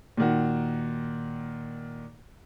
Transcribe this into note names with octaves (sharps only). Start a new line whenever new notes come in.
A#2 D#3 F#4